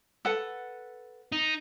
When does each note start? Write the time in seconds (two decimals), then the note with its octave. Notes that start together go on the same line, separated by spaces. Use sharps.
0.25 A4 B4 F#5
1.32 D#4